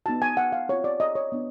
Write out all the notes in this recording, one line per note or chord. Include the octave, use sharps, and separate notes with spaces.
B3 D#4 F#4 A5
G#5
F#5
F5
C4 F4 C#5
D5
D#5
C#5
B3 D4